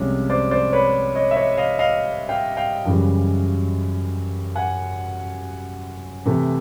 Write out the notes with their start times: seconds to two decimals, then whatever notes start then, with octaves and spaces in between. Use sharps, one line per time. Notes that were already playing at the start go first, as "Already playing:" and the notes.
Already playing: C2 C3 F3 G#3 C#4
0.30 C5 D5
0.51 C5 D5
0.72 B4 C#5
1.15 C#5 D#5
1.31 E5
1.36 C#5 D#5
1.57 D#5 F5
1.79 D#5 F5
2.29 F5 G5
2.57 F5 G5
2.85 F#2 C#3 E3 G3
4.55 F#5 G#5
6.26 C3 E3 A3